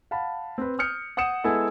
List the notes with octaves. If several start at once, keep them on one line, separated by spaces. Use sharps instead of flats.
F5 F#5 A5 B5
C4 B4
D#6 F6 G6 C#7
F#5 D#6 G6 C#7 E7
G#3 B3 E4 G#4 A4